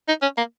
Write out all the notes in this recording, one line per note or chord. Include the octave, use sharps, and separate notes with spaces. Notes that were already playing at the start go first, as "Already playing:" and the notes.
D#4
C#4
A#3